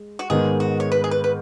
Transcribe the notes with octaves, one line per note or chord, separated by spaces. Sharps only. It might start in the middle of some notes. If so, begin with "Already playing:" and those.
Already playing: G#3
F#4
G#2 D#3 G#3 B3 G#4
F#4
C#5
B4
G#4
B4
B4